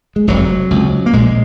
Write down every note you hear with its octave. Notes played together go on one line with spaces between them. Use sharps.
G#3
F1 F2 C3 F#3
C#2 C3
A#3
A#1 A#2 G#3